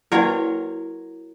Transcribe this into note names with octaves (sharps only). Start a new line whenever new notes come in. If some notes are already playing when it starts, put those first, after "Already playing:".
F#3 A#3 E4 F#4 A#4 B4 C#5 F#5